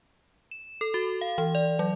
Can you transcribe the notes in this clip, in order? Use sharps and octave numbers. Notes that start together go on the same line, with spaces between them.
E7
A4
F#4
F5
E3
D5
F#3